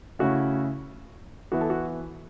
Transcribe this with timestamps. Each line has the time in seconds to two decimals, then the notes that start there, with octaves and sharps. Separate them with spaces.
0.19 C#3 A3 C#4 E4 F#4
1.52 E3 B3 E4 F#4
1.61 A4
1.70 F#4